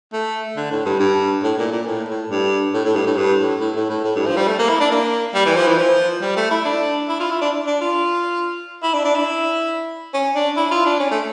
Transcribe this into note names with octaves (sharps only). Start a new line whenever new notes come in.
A3
D3
A2
G2
G2
A2
A#2
A#2
A2
A2
G2
A2
A2
G2
A2
G2
A2
A2
A2
A2
A2
G2
F3
G3
A3
A#3
E4
D4
A#3
G3
E3
F3
E3
F3
G3
A3
E4
D4
E4
F4
E4
D4
D4
F4
E4
D4
D4
E4
C#4
D4
E4
F4
D4
C#4
A3